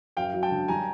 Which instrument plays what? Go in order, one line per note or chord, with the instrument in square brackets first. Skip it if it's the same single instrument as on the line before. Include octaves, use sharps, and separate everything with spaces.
[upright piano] F#2 [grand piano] F5 G5
[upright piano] F#3
[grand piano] G5 A5
[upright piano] D3
[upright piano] G3 [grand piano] G#5 A#5